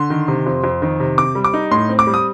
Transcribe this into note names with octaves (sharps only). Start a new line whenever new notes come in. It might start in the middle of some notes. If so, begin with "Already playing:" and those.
Already playing: D3 C6
D#3
C3
F2
F2
D#3
C3
C4 D6
G3
D6
D#4
A2 C6
C4
D6
G3
D#6